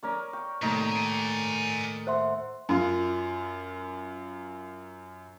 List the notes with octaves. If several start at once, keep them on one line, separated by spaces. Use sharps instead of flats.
C#4 A#4 C#5 D5 D6
G5 C#6
D#2 A2 C3 D#4 C#5 B5
D5 G#5
C5 E5 F#5 C6
F#2 F4